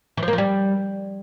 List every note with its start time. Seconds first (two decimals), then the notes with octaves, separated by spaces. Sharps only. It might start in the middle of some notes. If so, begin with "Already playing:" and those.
0.17 E3
0.23 F3
0.28 A#3
0.33 F3
0.38 G3